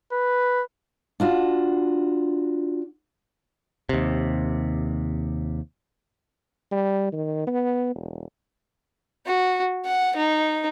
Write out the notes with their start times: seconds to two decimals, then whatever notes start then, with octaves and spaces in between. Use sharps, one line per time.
0.13 B4
1.20 D4 F4 F#4
3.89 D#2 C3
6.71 G3
7.12 D#3
7.47 B3
7.95 E1
9.26 F#4
9.85 F#5
10.16 D#4